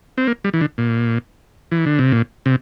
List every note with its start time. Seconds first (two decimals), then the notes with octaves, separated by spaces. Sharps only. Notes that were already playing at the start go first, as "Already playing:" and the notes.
0.18 C4
0.27 A#3
0.44 G3
0.53 E3
0.61 D3
0.78 A#2
1.72 E3
1.86 D3
1.99 C3
2.12 A#2
2.46 C3